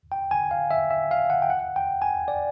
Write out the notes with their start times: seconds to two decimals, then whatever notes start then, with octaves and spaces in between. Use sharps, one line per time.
0.12 G5
0.31 G#5
0.51 F5
0.71 E5
0.91 E5
1.11 F5
1.30 F#5
1.42 G5
1.50 F#5
1.76 G5
2.02 G#5
2.28 D5